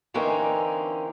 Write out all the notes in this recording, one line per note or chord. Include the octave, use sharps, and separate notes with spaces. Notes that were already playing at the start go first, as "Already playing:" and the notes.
D3 E3 A#3 C4 C#4 D#4